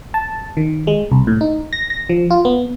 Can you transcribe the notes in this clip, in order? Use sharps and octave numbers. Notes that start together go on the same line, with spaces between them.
A5
D#3
G#3
C2
A2
D#4
A#6
A#6
F3
F4
B3